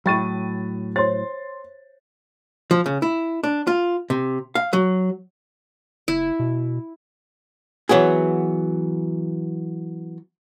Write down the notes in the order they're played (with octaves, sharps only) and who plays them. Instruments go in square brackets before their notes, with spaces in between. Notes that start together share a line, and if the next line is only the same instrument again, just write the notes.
[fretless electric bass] A2 F#3 [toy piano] E5 G5 C#6 [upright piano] B5 A6 D#7
[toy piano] C5 C#5 [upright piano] C6 A6
[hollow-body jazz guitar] F3
C#3
E4
D4
F4
C3
F5
F#3
[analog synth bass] F#1 [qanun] E4
[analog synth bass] B2
[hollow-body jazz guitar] E3 F#3 B3 G#4